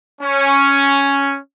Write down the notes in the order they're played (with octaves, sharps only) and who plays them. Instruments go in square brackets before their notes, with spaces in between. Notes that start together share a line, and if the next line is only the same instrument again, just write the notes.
[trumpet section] C#4